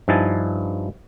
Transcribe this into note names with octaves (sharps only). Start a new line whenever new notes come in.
G2 F3 D#4 E4 G#5 A5